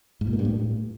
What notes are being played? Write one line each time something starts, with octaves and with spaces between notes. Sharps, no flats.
G#2
A#2
A#3
G2
A2